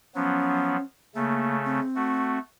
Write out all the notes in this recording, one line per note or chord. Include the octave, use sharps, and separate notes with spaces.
F3 F#3 B3 C#4
C#3 A3 A#3
C4
A3 F#4